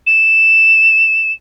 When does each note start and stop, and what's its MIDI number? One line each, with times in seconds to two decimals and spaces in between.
0.07 1.32 100